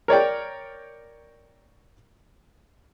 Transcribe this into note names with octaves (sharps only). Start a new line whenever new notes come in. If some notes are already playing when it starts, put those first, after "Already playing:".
A#4 C#5 D5 G5